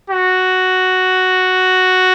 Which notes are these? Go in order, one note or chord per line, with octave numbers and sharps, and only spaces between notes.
F#4